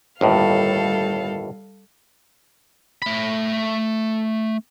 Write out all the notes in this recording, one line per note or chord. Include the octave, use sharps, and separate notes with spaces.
G1 D#2 A2 G3 A4 F5
A3 B5